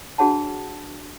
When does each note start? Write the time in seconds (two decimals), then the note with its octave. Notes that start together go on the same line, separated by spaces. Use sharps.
0.18 D4 F#4 G#4 C#5 F#5 A5